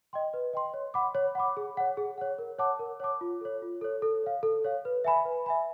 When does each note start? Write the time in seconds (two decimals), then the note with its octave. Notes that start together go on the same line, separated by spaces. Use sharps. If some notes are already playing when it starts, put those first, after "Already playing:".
0.13 D#5 G5 C6
0.34 B4
0.53 D#5 G5 C6
0.74 C#5
0.94 F#5 B5 D6
1.15 C#5
1.35 F#5 B5 D6
1.57 G#4
1.77 C#5 F#5
1.97 G#4
2.18 C#5 F#5
2.38 A#4
2.59 C#5 F#5 A5 D6
2.79 A#4
3.00 C#5 F#5 A5 D6
3.21 F4
3.41 A4 C#5
3.62 F4
3.81 A4 C#5
4.02 A4
4.23 C#5 F5
4.43 A4
4.64 C#5 F5
4.85 B4
5.04 E5 G#5 B5
5.25 B4
5.46 E5 G#5 B5